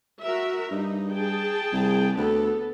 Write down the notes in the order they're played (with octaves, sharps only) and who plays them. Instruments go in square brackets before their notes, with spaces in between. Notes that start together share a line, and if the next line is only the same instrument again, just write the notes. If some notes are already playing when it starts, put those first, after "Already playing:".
[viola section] F#4 A#4 E5
[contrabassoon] G2 [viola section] D#4
[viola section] G#4 G5 A5
[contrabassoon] C2
[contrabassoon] D2 [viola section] B3 A4